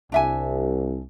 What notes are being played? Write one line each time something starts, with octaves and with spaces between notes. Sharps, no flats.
C2 D4 E5 G#5